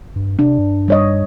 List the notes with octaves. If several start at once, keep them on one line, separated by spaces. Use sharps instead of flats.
G2
C3 D4
G2
G3 C#5 D#5